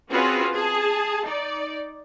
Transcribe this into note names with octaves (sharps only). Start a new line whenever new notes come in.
C4 C#4 F4 F#4 G#4 B4
G#4 A5
D#4 D5